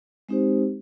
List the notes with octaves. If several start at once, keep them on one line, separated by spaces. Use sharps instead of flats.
G#3 C4 D#4 G4 C5